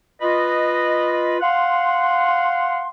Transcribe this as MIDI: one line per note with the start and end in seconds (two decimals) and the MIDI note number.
0.21 1.37 65
0.21 1.37 71
0.21 1.37 75
1.41 2.87 77
1.41 2.87 78
1.41 2.87 84